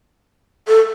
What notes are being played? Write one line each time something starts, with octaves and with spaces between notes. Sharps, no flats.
A4